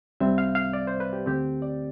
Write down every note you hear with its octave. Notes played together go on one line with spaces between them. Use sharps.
C2 C3 G3 C4 E5
F5
F5
D5
C5
B4
G4
D2 D3 A3 C4 G4
D5